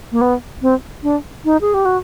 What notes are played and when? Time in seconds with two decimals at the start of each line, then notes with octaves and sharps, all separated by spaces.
0.12 A#3
0.21 B3
0.62 C4
1.03 D4
1.45 D#4
1.61 G#4
1.74 G4
1.85 F#4